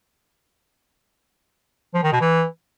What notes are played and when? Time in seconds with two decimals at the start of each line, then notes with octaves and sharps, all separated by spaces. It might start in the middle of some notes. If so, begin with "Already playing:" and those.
1.94 F3
2.03 D#3
2.12 B2
2.21 E3